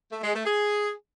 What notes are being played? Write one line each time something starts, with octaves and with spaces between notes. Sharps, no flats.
A3
G#3
A3
G#4